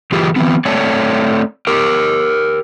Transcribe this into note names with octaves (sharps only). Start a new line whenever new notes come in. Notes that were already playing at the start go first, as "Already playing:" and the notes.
E3 F4 G4 G#4
E3 F#3 B3 C4
A3 C4 C#5 D5 A5
G4 A#4